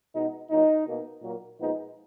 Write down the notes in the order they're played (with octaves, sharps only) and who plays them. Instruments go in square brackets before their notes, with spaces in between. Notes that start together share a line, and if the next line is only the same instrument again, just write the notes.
[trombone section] B2 G#3 B3 D#4
A#2 F#3 A#3 D#4
B2 A#3
A#2 F#3 A#3
A#2 F3 G#3 B3 D#4